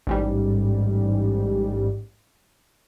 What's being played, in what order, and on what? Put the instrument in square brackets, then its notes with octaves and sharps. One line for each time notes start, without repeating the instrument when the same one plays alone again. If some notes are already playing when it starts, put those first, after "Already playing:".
[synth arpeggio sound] A1 G#2 G3